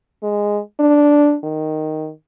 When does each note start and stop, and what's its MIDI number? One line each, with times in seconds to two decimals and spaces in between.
0.23 0.60 56
0.80 1.36 62
1.43 2.10 51